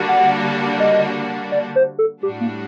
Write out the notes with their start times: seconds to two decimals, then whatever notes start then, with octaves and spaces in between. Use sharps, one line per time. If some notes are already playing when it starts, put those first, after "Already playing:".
Already playing: D3 G3 A#3 D4 F#4
0.09 F#5
0.80 D#5
1.52 D5
1.76 C5
1.99 A4
2.23 A2 G3 D4 F#4 G4
2.41 A#3